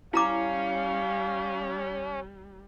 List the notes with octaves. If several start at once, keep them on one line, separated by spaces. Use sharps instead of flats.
G3 C#4 E4 F5 A#5 D6